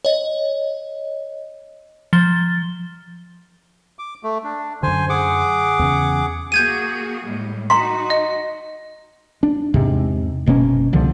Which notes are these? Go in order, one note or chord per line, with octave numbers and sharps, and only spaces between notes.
C#5 D#5
F3 A6 G7
D6
A3
D4
F#2 D3 C5 G#5
G#4 F#5 D6
E2 C#3
A#3 F#4 G#4 G6 G#6 D#7
A2 G3 G#3
D#4 F#4 A#5 C6 B6
D#5
D4
E2 G#2 C3
F#1 B2 A#3 C#4
C2 D3 F3